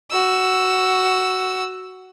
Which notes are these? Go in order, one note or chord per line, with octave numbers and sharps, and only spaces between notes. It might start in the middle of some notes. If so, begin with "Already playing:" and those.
F#4 E6